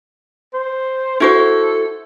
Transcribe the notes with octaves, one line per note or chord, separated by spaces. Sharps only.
C5
E4 F#4 A4 C5